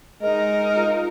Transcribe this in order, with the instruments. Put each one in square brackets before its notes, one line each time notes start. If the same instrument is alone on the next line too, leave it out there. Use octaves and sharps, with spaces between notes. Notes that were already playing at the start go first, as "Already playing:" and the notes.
[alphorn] G#3 [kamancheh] D#4 A#4 [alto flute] D#5
[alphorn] F4